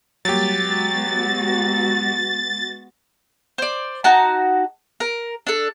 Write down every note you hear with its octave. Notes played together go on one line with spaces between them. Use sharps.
F#3 G3 A#3 G4 A6
G#3 B3 F#4
C5 D5
D#4 F#4 A5
A#4
D4 A4